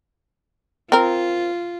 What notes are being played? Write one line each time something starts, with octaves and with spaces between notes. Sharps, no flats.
C4 F4 A#4